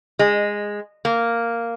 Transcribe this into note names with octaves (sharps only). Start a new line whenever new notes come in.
G#3
A#3